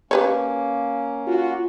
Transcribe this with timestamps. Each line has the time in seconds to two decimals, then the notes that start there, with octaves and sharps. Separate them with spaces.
0.11 A#3 C#4 G4 B4 C#5
1.27 F4 F#4